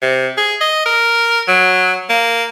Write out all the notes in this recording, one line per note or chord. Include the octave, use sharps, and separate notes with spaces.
C3
G#4
D#5
A#4
F#3
A#3